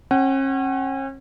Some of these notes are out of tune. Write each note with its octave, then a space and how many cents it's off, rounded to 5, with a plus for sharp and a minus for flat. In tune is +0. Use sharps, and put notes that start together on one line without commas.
C#4 -40 F#5 +30